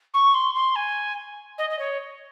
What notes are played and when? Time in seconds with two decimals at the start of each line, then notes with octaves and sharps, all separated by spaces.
0.13 C#6
0.34 C6
0.54 C6
0.75 G#5
1.58 D#5
1.70 D#5
1.78 C#5